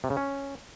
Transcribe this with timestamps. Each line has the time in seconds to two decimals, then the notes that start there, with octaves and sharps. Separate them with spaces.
0.04 C3
0.10 C#3
0.17 C#4